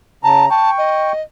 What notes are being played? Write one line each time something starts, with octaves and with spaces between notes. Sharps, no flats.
C#3 A5 A#5
G5 A5 C#6
D#5